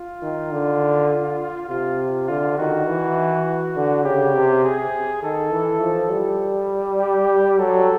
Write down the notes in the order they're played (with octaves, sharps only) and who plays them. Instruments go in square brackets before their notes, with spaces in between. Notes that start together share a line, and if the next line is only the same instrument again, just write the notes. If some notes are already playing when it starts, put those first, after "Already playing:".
Already playing: [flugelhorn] F4
[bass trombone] D#3
D3
[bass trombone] C3 [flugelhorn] F4
[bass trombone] D3 [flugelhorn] F4
[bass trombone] D#3 [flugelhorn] F#4
[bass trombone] E3
D3
[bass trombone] C#3 [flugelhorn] G4
[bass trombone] C3
[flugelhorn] G#4
[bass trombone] D#3 [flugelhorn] A4
[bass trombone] E3
F3
G3
[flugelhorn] G4
[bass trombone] F#3 [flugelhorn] A4